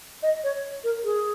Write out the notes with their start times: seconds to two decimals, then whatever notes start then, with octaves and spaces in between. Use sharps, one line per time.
0.23 D#5
0.44 C#5
0.84 A#4
1.04 G#4